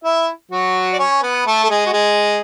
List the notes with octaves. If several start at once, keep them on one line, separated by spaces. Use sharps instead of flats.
E4 E5
F#3 F#4
D5
C#4 C#5
B3 B4
A3 A4
A4
G#3 G#4
F#4
G#3 G#4